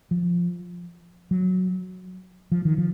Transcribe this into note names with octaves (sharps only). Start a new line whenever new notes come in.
F3
F#3
F3
D#3
F3